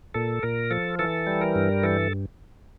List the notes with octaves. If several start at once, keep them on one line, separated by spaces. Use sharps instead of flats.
A#2 A4
A#2 A#4
F3 A4
E3 A4
G3
A#4
G2
E3 A4